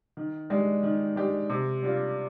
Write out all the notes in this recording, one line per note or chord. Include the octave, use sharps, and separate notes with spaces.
D#3
G#3 D4 G4
D#3
G#3 D4 G4
C3
G3 D4 F4